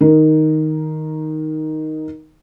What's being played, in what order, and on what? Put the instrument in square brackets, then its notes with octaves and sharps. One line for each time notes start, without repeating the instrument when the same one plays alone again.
[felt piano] D#3 D#4 A#4